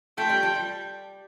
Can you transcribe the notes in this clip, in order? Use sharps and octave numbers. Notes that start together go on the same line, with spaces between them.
F3 A3 G5
G3
F3
G3